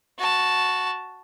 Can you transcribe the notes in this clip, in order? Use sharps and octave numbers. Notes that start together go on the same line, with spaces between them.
F#4 A5